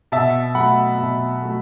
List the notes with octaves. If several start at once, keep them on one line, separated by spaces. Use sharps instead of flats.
B2 E5 A5
F#3 A3 F#5 B5
B2
F#3 A3